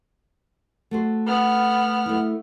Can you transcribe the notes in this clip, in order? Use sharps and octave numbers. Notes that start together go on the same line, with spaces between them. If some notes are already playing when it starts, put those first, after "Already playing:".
A3 F#4 C5
B3 F6
A3 E4